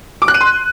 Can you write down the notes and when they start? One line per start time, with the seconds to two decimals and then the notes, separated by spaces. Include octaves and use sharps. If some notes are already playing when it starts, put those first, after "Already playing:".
0.22 D6
0.28 F#6
0.34 D#7
0.41 C6